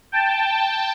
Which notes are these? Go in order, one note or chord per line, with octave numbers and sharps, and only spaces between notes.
G5 A5